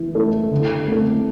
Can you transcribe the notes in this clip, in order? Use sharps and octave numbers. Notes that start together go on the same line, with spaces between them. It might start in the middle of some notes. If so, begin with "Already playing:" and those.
Already playing: E3 E4
A3 E4 A4
D3
A3 C4 E4 A4